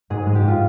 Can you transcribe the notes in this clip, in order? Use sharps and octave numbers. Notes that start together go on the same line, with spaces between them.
G#2 G#4
G#3 G#4
G4
G#2 F4